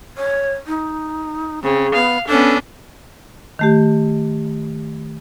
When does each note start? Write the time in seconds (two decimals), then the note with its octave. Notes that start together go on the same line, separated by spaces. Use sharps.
0.18 C#5
0.67 D#4
1.63 C#3 C4
1.94 B3 F5
2.27 B3 C#4 D4 A4
3.59 D#3 A3 G4